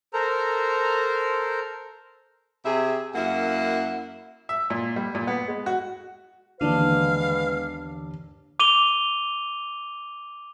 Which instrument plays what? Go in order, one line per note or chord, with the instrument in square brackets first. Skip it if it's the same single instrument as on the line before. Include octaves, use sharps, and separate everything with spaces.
[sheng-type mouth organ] A4 A#4 C5 A#5
[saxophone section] C3 G4 G#4 E5
F#2 A#3 E4 F#5
[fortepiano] E5
A#2
G3
A#2
B3
G#3
F#4
[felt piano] D#2 D4 [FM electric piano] D3 E3 [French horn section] G#3 B3 B4 [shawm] F5
[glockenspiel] D6 D#7 F7 G7